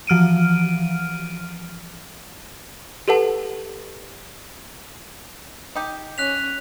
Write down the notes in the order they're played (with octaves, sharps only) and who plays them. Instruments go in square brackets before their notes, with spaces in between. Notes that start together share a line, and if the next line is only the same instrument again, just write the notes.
[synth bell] E3 F3 F6 D7 D#7
[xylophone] G4 A4 B4 F#5 A5
[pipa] D#4 G4
[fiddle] C#4 [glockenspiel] F#6 B6 F7